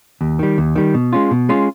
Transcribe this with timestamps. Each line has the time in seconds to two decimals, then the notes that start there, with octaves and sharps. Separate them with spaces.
0.21 D#2
0.39 D#3 G3
0.58 D#2
0.76 D#3 G3
0.94 B2
1.13 G#3 C#4 F4
1.31 B2
1.49 G#3 C#4 F4